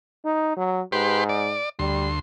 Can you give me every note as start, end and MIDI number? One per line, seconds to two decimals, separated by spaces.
0.25 0.52 63
0.56 0.81 54
0.92 1.57 44
0.92 1.24 67
0.92 1.24 71
0.92 1.24 84
1.29 1.69 74
1.79 2.19 38
1.79 2.09 55
1.79 2.19 84